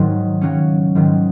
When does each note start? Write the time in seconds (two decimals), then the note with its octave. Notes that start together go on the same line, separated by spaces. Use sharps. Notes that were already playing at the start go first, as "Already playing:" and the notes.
Already playing: G#2 D#3 F#3
0.41 C#3 F#3 C#4
0.95 G#2 D#3 F#3